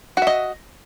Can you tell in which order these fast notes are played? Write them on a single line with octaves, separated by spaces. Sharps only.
F#4 E5 D#5